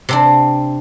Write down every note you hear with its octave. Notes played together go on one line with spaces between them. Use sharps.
C3 C4 D4